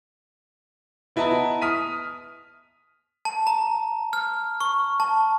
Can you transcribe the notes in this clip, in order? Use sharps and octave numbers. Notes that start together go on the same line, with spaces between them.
B3 E4 B4 D#5 A5 A#5
D#6 F6 B6 D#7
A5
A#5
F6
C#6
A5